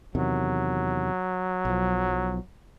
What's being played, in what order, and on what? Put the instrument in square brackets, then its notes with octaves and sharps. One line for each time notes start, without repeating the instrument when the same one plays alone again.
[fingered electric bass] E2 C3 D#3 [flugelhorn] F#3
[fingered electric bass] B1 F3